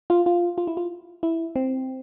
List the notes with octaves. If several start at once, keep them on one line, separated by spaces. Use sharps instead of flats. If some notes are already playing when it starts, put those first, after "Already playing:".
F4
F4
F4
E4
F4
E4
C4